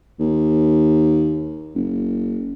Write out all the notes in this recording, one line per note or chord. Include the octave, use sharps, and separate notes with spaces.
D#2
F#1